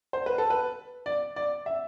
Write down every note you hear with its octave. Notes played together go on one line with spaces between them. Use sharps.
C5
B4
A4
B4
D5
D5
E5